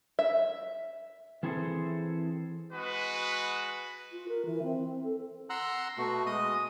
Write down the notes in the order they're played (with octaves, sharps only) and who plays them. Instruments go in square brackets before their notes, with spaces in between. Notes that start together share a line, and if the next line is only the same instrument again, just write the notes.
[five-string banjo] E5
[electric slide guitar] E3 C4 E4 G#4 A4 C5
[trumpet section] G#3 F#4 B4
[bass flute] F4
A#4
E3
C4
A4
[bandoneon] F#5 A#5 C6 E6 F#6
B2 A3 F#4
G#3 D#5 D#6